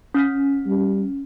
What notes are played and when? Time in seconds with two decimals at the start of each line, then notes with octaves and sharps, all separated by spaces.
0.14 C#4 F6 B6
0.67 G3